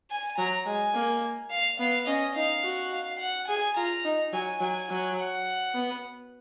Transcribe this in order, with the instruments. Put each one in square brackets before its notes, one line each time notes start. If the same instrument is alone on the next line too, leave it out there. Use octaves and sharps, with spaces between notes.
[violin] G#5
[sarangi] F#3 [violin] A#5
[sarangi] G#3 [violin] G#5
[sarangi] A#3
[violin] F5
[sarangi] B3 [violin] F5
[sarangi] C#4 [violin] D#5
[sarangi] D#4 [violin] F5
[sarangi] F#4
[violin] F5
F#5
[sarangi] G#4 [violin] G#5
[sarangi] F4 [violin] A#5
[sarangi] D#4
[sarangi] F#3 [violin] G#5
[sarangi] F#3 [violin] G#5
[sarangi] F#3
[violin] F#5
[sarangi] B3